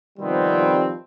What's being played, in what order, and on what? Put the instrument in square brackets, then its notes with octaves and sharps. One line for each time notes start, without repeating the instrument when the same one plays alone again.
[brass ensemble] C3 D#3 F3 G3 B3 C4